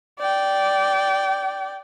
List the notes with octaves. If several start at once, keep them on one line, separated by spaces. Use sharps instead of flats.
D5 G5